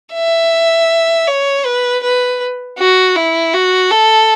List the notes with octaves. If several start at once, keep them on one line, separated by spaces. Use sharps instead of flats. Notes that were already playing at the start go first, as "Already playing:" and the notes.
E5
C#5
B4
B4
F#4
E4
F#4
A4